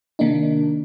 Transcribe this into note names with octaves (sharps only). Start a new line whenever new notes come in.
C3 D#3 A#3 D4 D#4